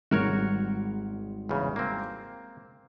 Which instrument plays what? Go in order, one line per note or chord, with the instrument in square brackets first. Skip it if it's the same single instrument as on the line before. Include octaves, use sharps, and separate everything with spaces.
[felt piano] G#1 G3 G#3 [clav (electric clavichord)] F#4 A#4 C#5
[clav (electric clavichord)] E2 C#3
A#3 C4